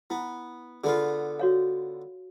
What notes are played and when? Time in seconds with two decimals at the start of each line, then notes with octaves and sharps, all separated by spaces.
0.10 B3 E4
0.84 D3 B3 F4 G#4
1.39 F#4 C#5 F5